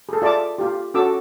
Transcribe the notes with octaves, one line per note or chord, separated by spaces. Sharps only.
G#4 A4
F4 D5 E5 A5 D6
F4 G4
C#4 F#4 A4 D6 E6